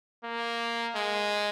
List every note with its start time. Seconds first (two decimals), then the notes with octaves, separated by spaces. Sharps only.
0.24 A#3
0.96 G#3